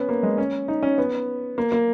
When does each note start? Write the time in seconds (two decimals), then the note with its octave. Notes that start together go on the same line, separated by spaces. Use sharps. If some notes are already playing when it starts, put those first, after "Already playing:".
Already playing: B3 C#4
0.09 A#3
0.23 G#3
0.38 C#4
0.68 D#4
0.83 C#4
0.98 B3
1.58 A#3
1.72 A#3